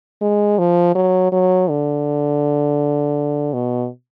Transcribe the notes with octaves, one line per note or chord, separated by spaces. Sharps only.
G#3
F3
F#3
F#3
D3
B2